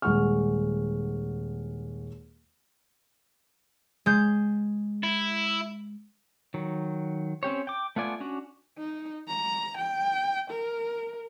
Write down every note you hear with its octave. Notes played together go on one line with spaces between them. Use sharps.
D#1 G#3 G#4 F#5 C#6 F6
G#3 G6
E4
D#3 F#3
C4 C#4 G4 C#5
G5 D6
A3 B3 F4 D5 G#5
C#4 D4 F#4
D#4
A#5
G5
A#4